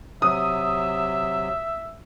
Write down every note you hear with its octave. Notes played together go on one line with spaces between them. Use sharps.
C3 F#3 E5 D#6